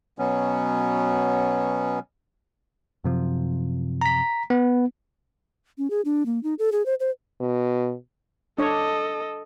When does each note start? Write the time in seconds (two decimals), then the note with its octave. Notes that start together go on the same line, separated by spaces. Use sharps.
0.19 B2 F#3 B3 C#4
3.04 F#2 C3 F3
4.01 A#5 B6
4.50 B3
5.78 C#4
5.90 G#4
6.05 D4
6.26 A#3
6.43 D#4
6.59 A4
6.72 G#4
6.86 C5
7.00 C5
7.41 B2
8.58 D4 A4 C#5 D#5